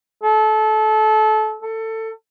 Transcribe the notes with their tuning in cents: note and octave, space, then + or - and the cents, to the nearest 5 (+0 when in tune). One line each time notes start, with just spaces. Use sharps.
A4 -25
A4 +20